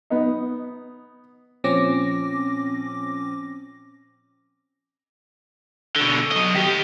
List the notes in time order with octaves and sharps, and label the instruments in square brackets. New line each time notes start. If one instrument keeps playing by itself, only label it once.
[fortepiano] B3 D#4
[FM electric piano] A#2 F3 C4 C#4 D6 A#6
[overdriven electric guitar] B2 D3
F#3 D#5
D#3 G4